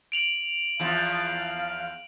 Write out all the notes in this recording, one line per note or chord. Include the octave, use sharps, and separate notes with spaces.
D7 F7 F#7
E2 F3 F5